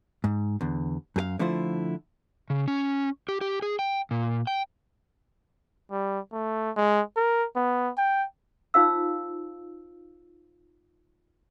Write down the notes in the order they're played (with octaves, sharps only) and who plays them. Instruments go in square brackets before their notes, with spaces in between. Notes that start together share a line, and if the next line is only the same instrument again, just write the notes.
[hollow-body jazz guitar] G#2
E2 D3
F#2 G#4 F5
D3 F3 A3 E4 F4 C5
[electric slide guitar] C#3
C#4
G4
G4
G#4
G5
A#2
G5
[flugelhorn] G3
A3
G#3
A#4
B3
G5
[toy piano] D#4 F4 C5 F5 E6